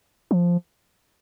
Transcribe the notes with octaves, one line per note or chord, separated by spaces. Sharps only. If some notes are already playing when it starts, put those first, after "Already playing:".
F3